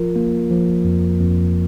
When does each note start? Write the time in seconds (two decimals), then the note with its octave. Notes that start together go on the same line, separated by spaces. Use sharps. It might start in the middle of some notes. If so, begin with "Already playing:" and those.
Already playing: F3 F4 A#4
0.16 A#3
0.51 F3
0.85 F2
1.20 F2